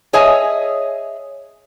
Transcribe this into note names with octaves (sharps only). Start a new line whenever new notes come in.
G#4 C#5 D#5 E5 G#5